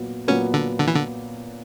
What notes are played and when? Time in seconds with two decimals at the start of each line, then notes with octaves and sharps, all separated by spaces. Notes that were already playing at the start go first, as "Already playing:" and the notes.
Already playing: A#2 F#3 B3
0.28 A#2 F#3 B3 C#4
0.54 D3
0.80 D3
0.87 E3
0.95 D3